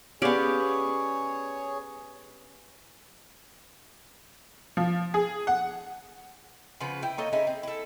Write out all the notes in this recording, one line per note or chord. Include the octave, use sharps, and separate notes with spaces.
B3 C#4 G4 G#4 C#5 D5 F5
F3
G#4
F#5
C#3 F3 B3 B4
E4 G5
A#3 A4 C#5 D#5
G#3 C#4 D#4 E4
C4
E4 A4